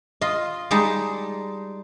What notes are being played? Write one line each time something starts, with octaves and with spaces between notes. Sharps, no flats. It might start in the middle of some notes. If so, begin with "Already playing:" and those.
F4 D#5
G3 G#3 D#4 A5